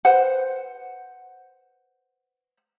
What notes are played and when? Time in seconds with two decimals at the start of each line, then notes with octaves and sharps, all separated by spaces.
0.05 B4 C5 F#5